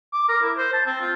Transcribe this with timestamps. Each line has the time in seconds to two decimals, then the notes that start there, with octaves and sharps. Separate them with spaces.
0.13 D6
0.29 A#4
0.42 E4
0.57 C5
0.73 A5
0.86 C4
1.01 F4